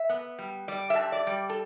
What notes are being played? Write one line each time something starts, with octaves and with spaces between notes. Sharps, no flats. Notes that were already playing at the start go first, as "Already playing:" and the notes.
Already playing: E5
B3
G3
G3 D5
E5
G2
D5
G3
A4